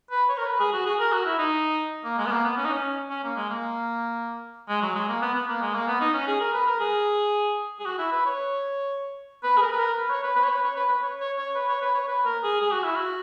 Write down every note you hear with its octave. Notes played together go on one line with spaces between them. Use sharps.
B4
C#5
A#4
B4
G#4
F#4
G#4
A#4
F#4
E4
D#4
A#3
G#3
B3
A#3
B3
C#4
D#4
C#4
C#4
A#3
G#3
A#3
G#3
F#3
G#3
A#3
B3
B3
A#3
G#3
A#3
B3
D#4
C#4
G#4
A#4
B4
A#4
G#4
G#4
F#4
E4
B4
C#5
B4
G#4
A#4
B4
A#4
B4
C#5
B4
B4
C#5
B4
C#5
B4
B4
C#5
C#5
C#5
B4
C#5
B4
C#5
B4
A#4
G#4
G#4
F#4
E4
F#4